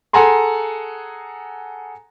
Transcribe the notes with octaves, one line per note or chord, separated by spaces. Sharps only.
G#4 A4 F#5 G#5 A#5 C6